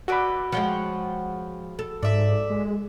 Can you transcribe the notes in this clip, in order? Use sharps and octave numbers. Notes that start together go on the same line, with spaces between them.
F#4 A4 B4 D5 B5
F3 G#3 C#5 F#5 G5
A4
G#2 D5 E5
G#3